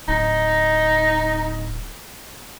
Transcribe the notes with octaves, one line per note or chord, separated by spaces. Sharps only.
D1 D#4